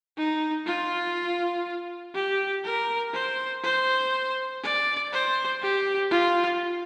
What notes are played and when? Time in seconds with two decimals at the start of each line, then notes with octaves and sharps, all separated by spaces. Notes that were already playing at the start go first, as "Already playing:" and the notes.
0.17 D#4
0.67 F4
2.15 G4
2.64 A#4
3.14 C5
3.63 C5
4.63 D5
5.13 C5
5.62 G4
6.11 F4